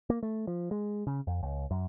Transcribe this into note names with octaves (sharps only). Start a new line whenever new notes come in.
A#3
A3
F3
G#3
C#3
F2
C#2
F#2